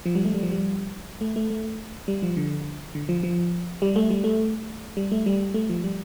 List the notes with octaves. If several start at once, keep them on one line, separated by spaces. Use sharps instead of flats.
F3
G3
A3
G3
F3
G3
A3
A3
A3
G3
F3
D3
D3
F3
F3
G3
A3
G3
A3
G3
A3
G3
A3
F3
G3